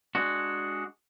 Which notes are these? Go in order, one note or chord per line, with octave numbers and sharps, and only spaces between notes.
G#3 D4 F#4